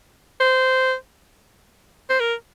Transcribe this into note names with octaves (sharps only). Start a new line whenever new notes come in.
C5
C5
A#4